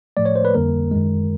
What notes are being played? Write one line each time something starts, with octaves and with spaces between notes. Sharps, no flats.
A2 F3 A3 D5
C#5
C5
B4
F2 D3 G3 A#3 A#4
F#2 D#3 G#3